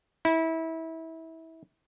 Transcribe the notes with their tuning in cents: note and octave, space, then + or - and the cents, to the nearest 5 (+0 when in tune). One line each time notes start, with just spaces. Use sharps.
E4 -25